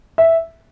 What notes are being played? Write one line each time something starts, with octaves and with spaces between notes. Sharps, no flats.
E5